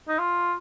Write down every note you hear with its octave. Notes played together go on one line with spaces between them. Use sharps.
D#4
F4